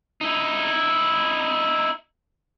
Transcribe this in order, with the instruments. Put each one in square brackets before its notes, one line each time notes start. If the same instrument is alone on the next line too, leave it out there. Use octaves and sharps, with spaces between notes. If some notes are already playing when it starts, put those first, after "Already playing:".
[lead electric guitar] D#4 E4